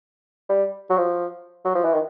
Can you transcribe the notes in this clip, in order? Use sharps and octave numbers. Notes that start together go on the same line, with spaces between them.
G3
F#3
F3
F#3
F3
E3
D#3